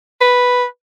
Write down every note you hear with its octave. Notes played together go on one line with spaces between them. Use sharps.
B4